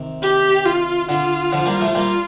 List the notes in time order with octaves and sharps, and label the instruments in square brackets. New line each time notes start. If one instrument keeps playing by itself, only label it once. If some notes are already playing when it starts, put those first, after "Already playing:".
Already playing: [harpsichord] C3 D#3
[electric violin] G4
F4
[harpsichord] D3 [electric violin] F4
[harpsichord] D3 F3
G3 A#3
F3 A3
[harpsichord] G3 A#3 [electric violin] F4